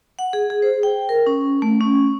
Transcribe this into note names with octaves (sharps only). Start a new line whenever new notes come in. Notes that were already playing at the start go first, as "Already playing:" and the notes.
F#5
G#4
G#4
C5
G5
A#4
C#4
A3
C#4